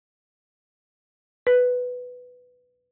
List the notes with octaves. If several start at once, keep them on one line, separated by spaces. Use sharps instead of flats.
B4